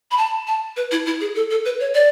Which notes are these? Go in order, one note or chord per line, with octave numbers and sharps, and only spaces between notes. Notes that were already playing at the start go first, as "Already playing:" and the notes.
B5
A5
A5
B4
E4
E4
G#4
A4
A4
B4
C#5
D5